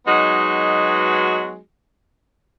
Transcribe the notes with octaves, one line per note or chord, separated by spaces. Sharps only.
F#3 G#3 B3 D#4 F#4